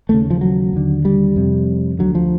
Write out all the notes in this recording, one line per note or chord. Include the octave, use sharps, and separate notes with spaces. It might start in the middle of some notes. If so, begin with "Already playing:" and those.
D#2 C#3 A3
F3
F#3
D#2 D3
G3
F2 C3
D2 D3 F#3
F3